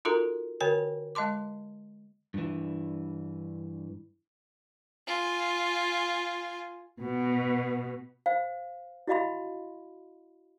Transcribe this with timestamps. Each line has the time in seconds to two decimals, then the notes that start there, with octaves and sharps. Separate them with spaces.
0.05 D#4 F4 F#4 A4 A#4 A#5
0.61 D3 F#4 A#4 C#5 G5 G#5
1.15 G#3 D#5 A5 C6 D6
2.34 G2 E3
5.07 F4 G#5
7.01 B2
8.26 C5 F5
9.07 E4 F#4 D#5 F5 B5 C6